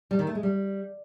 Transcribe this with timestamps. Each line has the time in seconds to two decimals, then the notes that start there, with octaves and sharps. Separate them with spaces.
0.11 G3
0.19 D#3
0.27 A3
0.35 G#3
0.43 G3